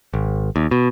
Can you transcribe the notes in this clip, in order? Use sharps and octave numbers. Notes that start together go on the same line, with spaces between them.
G#1
D#2
B2